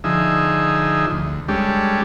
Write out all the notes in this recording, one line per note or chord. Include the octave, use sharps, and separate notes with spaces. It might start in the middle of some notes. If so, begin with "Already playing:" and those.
D3 F3 D#4 G#4 E5
D2
G3 G#3 C#4 D4 G4 A4